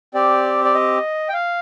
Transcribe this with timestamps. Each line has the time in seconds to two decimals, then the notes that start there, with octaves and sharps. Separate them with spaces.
0.14 C4 G4 D5
0.65 D5
0.74 D#5
1.29 G5
1.34 F5